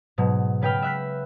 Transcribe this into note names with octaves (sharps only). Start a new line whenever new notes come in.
G#2 B2 F#3
C#3 B4 G5 B5 F6
E5 F#6 B6